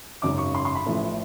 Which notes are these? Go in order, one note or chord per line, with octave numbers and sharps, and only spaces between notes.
G#1 F#2 C#3 D6
C#6
C6
C6
B5
A1 A2 F3